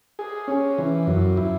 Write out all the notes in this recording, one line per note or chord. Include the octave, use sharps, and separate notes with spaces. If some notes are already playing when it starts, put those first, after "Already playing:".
G#4
C#4
E3
F#2
E4